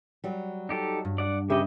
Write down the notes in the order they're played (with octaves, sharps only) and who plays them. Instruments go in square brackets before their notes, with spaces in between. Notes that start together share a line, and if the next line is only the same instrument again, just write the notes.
[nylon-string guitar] F#3 G3
[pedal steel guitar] D#4 G4 A4
[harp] G2
[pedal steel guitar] D5 F#5
[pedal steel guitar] C#3 D#5 [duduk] G4 [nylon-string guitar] B4 E5